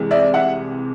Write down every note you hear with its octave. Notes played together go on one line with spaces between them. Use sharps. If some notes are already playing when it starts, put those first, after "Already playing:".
Already playing: C2 C3 E3 G#3
D5 E5
E5 F#5